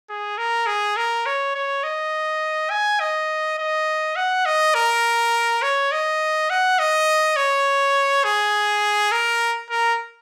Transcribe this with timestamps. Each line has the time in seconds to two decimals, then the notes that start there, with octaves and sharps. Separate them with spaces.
0.09 G#4
0.38 A#4
0.67 G#4
0.97 A#4
1.26 C#5
1.55 C#5
1.84 D#5
2.71 G#5
3.00 D#5
3.59 D#5
4.16 F#5
4.46 D#5
4.74 A#4
5.62 C#5
5.92 D#5
6.50 F#5
6.79 D#5
7.37 C#5
8.24 G#4
9.12 A#4
9.70 A#4